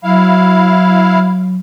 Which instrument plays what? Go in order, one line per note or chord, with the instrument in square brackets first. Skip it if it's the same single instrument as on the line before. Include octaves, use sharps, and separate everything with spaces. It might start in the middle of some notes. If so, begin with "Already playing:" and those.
[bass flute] F#3 [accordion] E4 F5